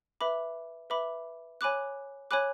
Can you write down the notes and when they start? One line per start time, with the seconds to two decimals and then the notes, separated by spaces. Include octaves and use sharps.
0.21 B4 E5 B5 D6
0.90 B4 E5 B5 D6
1.61 C#5 G#5 B5 D6 F#6
2.31 C#5 G#5 B5 D6 F#6